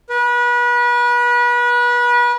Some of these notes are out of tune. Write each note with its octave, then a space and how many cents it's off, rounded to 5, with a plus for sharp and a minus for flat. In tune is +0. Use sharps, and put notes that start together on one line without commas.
B4 -30